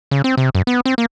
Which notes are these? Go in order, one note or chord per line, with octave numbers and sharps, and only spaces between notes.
C#3
C4
C3
F#2
B3
C4
A#3